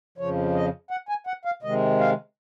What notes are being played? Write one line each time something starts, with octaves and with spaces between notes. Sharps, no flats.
F2 C#3 F3 C#5
D#5
F#5
G#5
F#5
F5
C3 D#3 G#3 D#5
F5